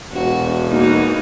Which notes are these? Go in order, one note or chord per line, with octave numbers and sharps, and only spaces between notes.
E1 F#4
E3 A#3 D#4 F#4